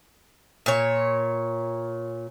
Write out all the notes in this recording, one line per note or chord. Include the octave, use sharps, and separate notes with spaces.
A#2 C#5